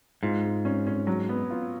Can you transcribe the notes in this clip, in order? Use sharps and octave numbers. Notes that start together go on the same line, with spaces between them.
G#2 F4
G#3
C#4
C#4
F#3
B3
F4